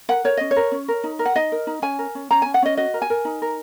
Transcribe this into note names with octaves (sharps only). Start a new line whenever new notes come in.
A#4 F#5
A#4 C#5
C#4 D#5
C#5
A#4
C#4
A#4
D#4
A#4
F#5
D#4 D#5
A#4
D#4
C#4 G#5
A#4
C#4
C#4 A#5
C#4 G#5
F#5
C#4 D#5
F#4 D#5
A#4
G#5
A#4
D#4
A#4